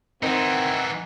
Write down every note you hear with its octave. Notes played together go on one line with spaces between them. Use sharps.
D#3 E3 C4 D#4 F#5